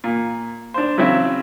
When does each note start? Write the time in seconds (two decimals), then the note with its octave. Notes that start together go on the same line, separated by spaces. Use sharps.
0.04 A#2
0.74 D4 C5
0.98 C#3 F#3 C4 E4